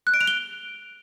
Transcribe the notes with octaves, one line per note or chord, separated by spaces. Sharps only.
F#6
D7
F7
G7